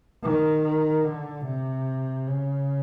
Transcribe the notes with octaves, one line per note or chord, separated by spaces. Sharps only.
D#3
D3
C3
C#3